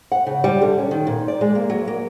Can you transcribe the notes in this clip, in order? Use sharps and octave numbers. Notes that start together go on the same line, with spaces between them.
F#5
C#3
G3
D3
C#4
D#3
A#2
D5
G#3
A#3
F#3
A#3